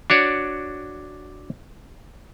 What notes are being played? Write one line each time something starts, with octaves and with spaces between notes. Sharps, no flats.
D4 F#4 C#5 D5